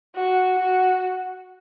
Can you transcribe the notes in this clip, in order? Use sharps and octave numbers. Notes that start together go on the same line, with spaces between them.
F#4
F#4